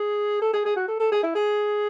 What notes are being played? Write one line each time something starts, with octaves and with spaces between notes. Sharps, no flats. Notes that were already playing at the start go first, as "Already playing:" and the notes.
Already playing: G#4
A4
G#4
G#4
F#4
A4
A4
G#4
E4
G#4